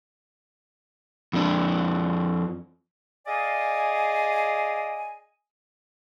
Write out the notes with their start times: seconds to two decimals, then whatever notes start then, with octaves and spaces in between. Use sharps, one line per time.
1.33 F2 D4
3.26 G#4 D5 D#5 F5 G#5